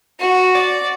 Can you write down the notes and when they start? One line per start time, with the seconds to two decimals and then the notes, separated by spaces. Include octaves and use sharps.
0.20 F#4
0.55 D5